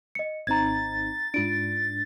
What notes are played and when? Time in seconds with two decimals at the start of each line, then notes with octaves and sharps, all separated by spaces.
0.15 D#5 C#7
0.47 G#1 C4 D#4 A#5 G#6 A6
1.34 G#2 D4 F4 D7